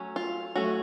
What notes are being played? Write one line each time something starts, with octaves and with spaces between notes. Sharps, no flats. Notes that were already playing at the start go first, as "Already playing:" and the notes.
Already playing: F#3 A3 C#4
F4
F#3 A3 C#4 F#4